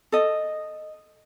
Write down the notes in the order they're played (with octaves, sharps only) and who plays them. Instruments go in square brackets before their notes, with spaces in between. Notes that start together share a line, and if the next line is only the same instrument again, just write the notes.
[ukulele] A4 D#5